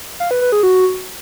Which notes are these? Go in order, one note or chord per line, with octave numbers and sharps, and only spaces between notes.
F5
B4
B4
G#4
F#4